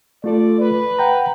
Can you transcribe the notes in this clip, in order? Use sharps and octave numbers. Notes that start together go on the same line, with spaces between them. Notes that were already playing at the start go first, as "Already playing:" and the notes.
A3 F4 A4 D5
B4
F#5 G5 A#5